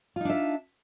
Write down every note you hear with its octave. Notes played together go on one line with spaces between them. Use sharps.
D4 D#4 F4 E5